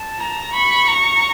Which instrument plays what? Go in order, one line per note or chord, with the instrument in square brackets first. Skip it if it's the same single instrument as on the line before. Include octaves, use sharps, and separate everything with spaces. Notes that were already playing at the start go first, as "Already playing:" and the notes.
Already playing: [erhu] A5
[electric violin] A#5
[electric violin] B5 [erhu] C#6
[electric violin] A#5